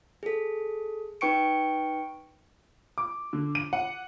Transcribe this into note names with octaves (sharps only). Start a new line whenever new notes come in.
G#4 A4
D#4 B4 G5 C#6 C#7 D7
D6
D3
D#7
F#5